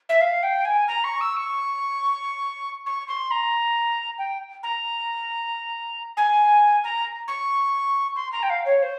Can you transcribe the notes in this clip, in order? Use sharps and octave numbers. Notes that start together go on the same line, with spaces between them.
E5
F5
G5
G#5
A#5
C#6
E6
C#6
C#6
C6
A#5
G5
A#5
G#5
A#5
C#6
C6
A#5
G5
F5
C#5
C5